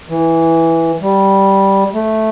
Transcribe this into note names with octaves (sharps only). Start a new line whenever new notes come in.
E3
G3
A3